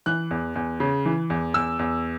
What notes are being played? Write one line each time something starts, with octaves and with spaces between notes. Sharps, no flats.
E3 F#6
E2
E2
C#3
E3
E2
E2 E6
E2